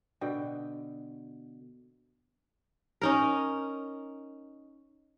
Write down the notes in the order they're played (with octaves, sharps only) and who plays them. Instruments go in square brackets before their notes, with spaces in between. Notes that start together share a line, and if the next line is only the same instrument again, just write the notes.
[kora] B2 D3 G5
C#4 D#4 A#4